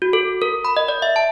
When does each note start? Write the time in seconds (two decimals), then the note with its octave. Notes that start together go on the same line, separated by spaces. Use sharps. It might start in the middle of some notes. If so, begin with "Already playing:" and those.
0.02 F#4
0.13 A4
0.42 A#4
0.65 B5
0.77 D#5
0.88 D5
1.02 E5
1.16 A5